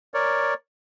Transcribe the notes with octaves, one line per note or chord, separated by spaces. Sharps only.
A#4 C#5 D5